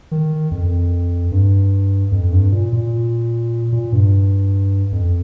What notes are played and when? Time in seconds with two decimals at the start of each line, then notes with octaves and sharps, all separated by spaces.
0.11 D#3
0.51 F2
1.32 G2
2.12 F2
2.32 G2
2.52 A#2
2.73 A#2
3.72 A#2
3.92 G2
4.92 F2